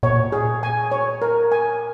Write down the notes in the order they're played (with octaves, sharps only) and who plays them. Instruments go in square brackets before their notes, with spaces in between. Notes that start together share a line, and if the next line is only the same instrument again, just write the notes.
[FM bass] A#2 [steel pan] C#5
[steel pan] G#4
G#5
C#5
A#4
G#5